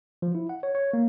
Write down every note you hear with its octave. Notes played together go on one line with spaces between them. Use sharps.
F3
E4
F#5
C#5
C#5
A#3